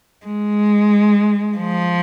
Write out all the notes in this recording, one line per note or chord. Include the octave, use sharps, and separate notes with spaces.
G#3
F3